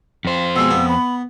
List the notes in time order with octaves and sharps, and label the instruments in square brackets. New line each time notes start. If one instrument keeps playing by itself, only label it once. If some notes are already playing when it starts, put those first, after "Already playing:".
[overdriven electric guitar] F2 C5
[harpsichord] B2 G#3 [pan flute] E6
[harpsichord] B3
[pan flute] B5